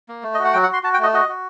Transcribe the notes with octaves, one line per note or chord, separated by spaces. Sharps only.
A#3
A3
D#5
F#4
F#5
F#3 G5
F#5
F#4
C6
F#4 A5
G5
A3 D#5
F#4 D#5
F#4